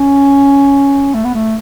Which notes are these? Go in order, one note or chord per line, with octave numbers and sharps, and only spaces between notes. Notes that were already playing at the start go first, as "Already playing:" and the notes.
Already playing: C#4
A3
B3
A3